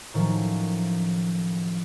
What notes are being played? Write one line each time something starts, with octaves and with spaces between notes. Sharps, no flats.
A2 D#3 F3 F#3 C#4